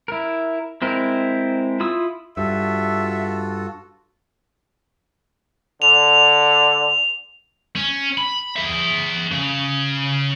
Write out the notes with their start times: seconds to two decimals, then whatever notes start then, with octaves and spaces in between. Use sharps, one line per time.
0.08 E4 A#4
0.82 G#3 C4 E4 A#4
1.80 E4 F4 D#6 E6
2.37 G2 F4 F#4 A4 E5
5.82 D3 F7
7.76 C#4
8.18 B5
8.56 G#4 E5
9.32 C#3